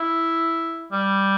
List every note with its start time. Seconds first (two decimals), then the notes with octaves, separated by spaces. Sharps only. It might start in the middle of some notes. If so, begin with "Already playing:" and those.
Already playing: E4
0.93 G3